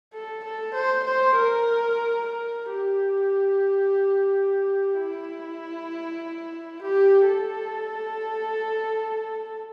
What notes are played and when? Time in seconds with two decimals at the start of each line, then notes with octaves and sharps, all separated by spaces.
0.14 A4
0.45 A4
0.75 C5
1.05 C5
1.36 A#4
2.27 A#4
2.72 G4
5.00 E4
6.83 G4
7.28 A4